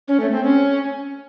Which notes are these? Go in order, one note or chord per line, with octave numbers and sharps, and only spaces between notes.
C#4
A3
C4
C#4